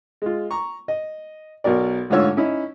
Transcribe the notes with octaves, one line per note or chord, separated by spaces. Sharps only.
G#3 F4
A#5 C#6
D#5
B1 B2 A#4 D5
A1 G#2 D3 F4 C#5 E6
C#4 D#4 E4